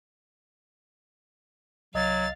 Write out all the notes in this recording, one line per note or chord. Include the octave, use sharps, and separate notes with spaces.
C2 F#3 D#5 F5 A6